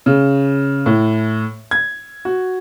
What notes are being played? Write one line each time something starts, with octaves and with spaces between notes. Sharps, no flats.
C#3
A2
G#6
F#4